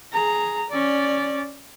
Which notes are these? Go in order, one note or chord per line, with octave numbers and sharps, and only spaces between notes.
G#4 A#5
C#4 D5